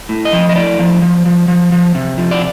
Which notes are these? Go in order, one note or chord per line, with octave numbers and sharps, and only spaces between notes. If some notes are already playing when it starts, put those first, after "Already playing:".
A2
D#5
F3
D#5
A2 D5
F3
F3
F3
F3
F3
C3
F3
D5